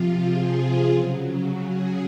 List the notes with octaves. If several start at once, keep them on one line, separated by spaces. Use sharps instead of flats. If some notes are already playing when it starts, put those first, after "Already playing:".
Already playing: C3 F3 F4
G#4
C#3 F#3
G#4